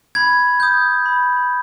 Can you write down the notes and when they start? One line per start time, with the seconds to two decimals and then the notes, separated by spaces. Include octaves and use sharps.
0.15 B5 G#6
0.60 D#6 G6
1.06 B5